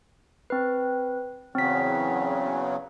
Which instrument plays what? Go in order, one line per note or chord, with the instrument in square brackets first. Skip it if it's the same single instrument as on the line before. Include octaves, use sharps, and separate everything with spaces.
[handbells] C4 B4
[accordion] E2 C#3 F#3 [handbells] C4 B6